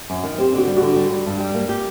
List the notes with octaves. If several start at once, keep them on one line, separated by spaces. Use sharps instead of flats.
F#2
D#3
C4 G4
D3
F#4
G3
D3 F#4
G3
G3
G2
G3
A#3
G4